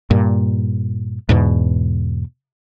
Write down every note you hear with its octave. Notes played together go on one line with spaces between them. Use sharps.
G2 A#2
E2 G#2 B2